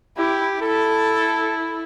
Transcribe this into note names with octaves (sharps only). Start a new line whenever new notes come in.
E4 G4
E4 A4